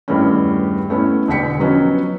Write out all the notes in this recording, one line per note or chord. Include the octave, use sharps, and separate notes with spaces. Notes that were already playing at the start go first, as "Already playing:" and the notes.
E2 G2 D#3 G3 A3 C#4
A3 B3 C#4 E4
E1 D3 G5 B6 C#7
F3 F#3 B3 C#4 D#4